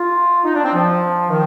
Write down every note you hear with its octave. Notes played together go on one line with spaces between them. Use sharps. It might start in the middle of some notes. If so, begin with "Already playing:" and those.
Already playing: F4
D#4
D4
C4
F3
D#3